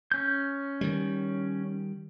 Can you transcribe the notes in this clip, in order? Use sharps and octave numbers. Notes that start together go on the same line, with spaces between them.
C#4 G6
D#3 G3